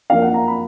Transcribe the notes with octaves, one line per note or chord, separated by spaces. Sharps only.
F#2 F3 A#3 F5
F#5
A#5
B5